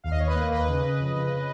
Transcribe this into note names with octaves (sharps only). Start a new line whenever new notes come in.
D#2 F5
D#5
D#2 C#5
B4 D#5
A#3
D#2 B4 D#5
C#3
C#3
F2
C#3